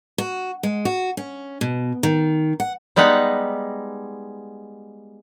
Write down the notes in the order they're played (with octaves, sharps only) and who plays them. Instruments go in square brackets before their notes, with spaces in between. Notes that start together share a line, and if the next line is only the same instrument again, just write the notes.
[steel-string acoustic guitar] F#4
G#3
F#4
C#4
B2
D#3
F#5
[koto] G3 G#3 B3 D#4 F#5